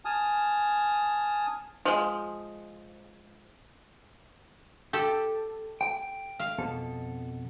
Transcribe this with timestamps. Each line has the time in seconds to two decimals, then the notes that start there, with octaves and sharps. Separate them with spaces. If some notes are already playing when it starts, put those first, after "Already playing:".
0.05 G#5 A5 D#6 F6
1.85 F3 G#3
4.93 G4 A4
5.81 G5
6.39 F5
6.58 F2 B2 A4